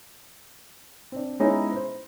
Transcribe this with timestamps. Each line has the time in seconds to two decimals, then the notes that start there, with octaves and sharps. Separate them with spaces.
1.12 C4 D4
1.40 G#3 B3 C#4 D#4 E4
1.72 B4 C5